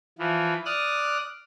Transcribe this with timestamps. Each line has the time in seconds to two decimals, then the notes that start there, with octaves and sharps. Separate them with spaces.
0.19 E3 F3
0.65 D5 D#6 F6 F#6